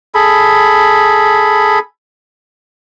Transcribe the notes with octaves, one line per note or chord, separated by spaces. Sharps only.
G#4 A4 B5